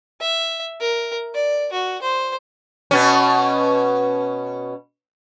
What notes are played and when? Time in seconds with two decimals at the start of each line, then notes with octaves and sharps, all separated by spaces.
0.21 E5
0.81 A#4
1.35 D5
1.73 F#4
2.02 C5
2.91 B2 C#4